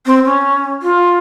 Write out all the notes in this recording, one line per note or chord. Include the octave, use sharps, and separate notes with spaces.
C4
C#4
F4